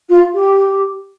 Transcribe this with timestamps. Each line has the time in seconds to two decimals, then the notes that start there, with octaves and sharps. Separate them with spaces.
0.09 F4
0.34 G4